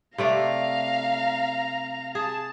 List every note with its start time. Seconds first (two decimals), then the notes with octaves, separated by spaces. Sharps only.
0.18 C3 A3 D5 F5 A#5
2.15 G#4 A5